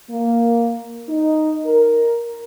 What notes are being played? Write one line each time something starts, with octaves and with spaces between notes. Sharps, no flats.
A#3
D#4
A#4